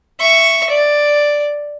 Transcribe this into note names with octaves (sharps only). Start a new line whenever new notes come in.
E5 C#6
D5